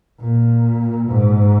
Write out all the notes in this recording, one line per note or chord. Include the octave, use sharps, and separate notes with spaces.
A#2
G#2